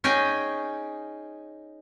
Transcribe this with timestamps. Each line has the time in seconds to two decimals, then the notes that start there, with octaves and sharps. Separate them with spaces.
0.04 C#4 D#4 G#4 G5 G#5